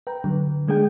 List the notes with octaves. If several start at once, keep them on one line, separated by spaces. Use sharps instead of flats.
B4 G5 A#5
D3 F#3
D3 G#3 D4 G#4 G5